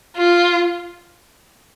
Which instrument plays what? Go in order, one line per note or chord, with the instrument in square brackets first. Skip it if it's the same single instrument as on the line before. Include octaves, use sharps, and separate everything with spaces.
[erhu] F4